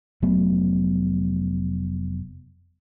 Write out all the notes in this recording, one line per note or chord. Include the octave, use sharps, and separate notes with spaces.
F1 F#3 A3 B3